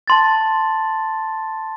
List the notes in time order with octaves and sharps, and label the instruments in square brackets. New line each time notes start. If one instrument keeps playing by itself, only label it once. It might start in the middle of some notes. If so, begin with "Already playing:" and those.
[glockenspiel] A5 C6 A6